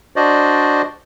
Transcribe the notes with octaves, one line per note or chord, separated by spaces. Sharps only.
D4 F#4 C5 D5 D#5